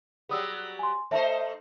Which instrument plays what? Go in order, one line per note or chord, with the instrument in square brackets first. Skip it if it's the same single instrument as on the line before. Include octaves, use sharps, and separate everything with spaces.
[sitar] F#3 G3 B3 [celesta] G#4 D#6 E6
[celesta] G#5 C6
[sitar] A3 D#4 C5 [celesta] C#5 E5 A5